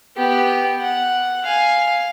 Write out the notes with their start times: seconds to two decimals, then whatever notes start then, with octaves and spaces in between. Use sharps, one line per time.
0.16 B3 G4
0.81 F#5
1.44 F5 G#5